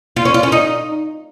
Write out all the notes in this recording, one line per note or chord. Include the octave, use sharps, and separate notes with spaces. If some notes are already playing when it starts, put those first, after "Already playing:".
F4
C#4
F4
C#4
D#4